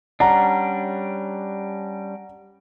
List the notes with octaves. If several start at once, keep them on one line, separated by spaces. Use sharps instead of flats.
G3 C#4 D4 F#5 A#5